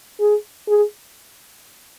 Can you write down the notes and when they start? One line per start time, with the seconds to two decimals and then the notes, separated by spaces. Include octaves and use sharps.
0.20 G#4
0.68 G#4